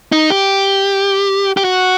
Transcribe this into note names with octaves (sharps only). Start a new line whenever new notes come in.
D#4
G4
G4
F#4